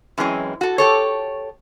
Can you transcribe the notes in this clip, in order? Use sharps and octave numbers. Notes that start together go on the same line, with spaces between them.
F#2 E3 G#3 C4 C#4
F#4 A4
G4 A4 C#5